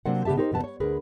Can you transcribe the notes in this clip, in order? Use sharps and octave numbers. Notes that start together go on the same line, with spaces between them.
C3 F#3 A#3 D4 C5 F#5
C#3 B3 G4 E5 A5
D#4 G4 A#4 C5
E2 B2 B3 A5
C#5
D2 G#4 A#4 B4